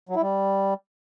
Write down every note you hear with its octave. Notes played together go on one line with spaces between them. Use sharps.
F#3
E4
G3